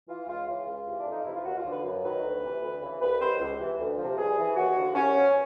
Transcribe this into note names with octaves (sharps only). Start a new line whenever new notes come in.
E3 F4
C#2 F4
C#3 E3 F4
C#2
C3 E3
D4
F2 D#4
C3 E3 E4
F4
D#2 F#4
F4
D3 F3
B4
F#2
D#3 F#3 B4
D2
C3 E3
D2
C#3 E3
C2 B4
C3 D#3 F#3 C5
C#2
C3 E3
D2
F3
C3
G2 G#4
E3
D#2 F#4
D3 F3
C2 C#4
B2 F#3